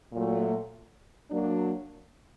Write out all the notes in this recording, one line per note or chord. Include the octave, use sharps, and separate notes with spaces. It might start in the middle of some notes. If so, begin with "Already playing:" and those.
A#2 F#3 A3
F#3 A#3 D4